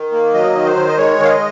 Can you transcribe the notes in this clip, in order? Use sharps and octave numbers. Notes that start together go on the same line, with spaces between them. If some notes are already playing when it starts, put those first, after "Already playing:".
Already playing: D#3
A#3
F#3 D#5
D#3
C5
D#3
D#5
G#3 C#5
D#3
F5
D#5